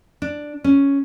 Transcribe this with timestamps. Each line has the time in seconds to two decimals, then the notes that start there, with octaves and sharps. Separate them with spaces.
0.22 D4
0.64 C#4